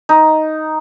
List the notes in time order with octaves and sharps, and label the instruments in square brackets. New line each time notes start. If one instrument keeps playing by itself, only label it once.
[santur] D#4